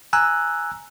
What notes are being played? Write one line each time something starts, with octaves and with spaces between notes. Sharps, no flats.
G#5 A#5 E6 F#6